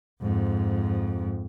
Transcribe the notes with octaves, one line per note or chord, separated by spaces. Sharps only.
F2 G#2